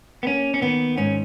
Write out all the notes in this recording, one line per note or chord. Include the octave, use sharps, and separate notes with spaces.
B3
A#3 C#4
C#4
D#3 B3
G#2 C#4